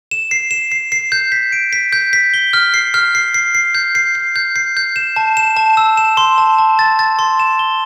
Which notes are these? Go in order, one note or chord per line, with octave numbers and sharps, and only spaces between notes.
E7
C7
E7
C7
C7
G6
B6
D7
B6
G6
B6
G7
F6
C7
F6
C7
C7
C7
G6
C7
C7
G6
C7
G6
E7
A5
E7
A5
E6
E7
C6
A5
A5
A6
A6
C6
E7
G7